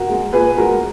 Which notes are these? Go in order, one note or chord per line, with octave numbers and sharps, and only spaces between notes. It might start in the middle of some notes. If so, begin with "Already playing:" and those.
Already playing: F#4 A#4
G#3
A#2 G#4 B4
G#3 F#4 A#4